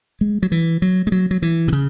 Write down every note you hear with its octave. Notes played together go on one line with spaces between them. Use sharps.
G#3
F#3
E3
F#3
G#3
F#3
F#3
E3
C3
C#3